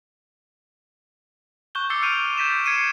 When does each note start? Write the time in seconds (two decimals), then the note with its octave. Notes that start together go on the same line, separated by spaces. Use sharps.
1.75 C#6 F#6 G6 G7
1.90 D6 E6 A6 C7 C#7 G7
2.02 E6 F6 G6 D7 D#7 F7
2.38 G6 A6 B6 D#7 E7
2.65 G#6 C7 C#7 D#7 E7